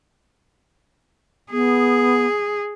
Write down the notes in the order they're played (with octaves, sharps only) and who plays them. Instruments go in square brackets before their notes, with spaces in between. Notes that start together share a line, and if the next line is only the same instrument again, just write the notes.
[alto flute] B3 [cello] G#4